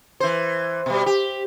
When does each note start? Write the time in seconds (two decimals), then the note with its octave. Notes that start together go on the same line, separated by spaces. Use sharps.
0.20 E3 C5
0.86 B2 G3
1.06 G4